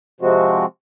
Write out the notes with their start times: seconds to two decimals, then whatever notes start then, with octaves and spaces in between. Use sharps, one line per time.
0.20 C3 F3 G#3 C4 F#4